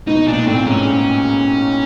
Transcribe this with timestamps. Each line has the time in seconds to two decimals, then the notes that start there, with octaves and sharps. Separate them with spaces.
0.08 B2 D#4
0.27 A#2 D4
0.47 A2 C4
0.66 G#2 C#4